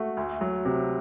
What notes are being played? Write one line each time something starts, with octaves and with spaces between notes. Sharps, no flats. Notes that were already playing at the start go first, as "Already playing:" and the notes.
Already playing: A3 F#4
D2
F#3
C3